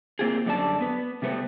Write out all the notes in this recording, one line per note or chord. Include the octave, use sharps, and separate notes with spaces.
A#3 C4 F4 G4 G#4
F#2 D3 G3 D5 A5
B3 B4
C3 G3 A3 B3 C4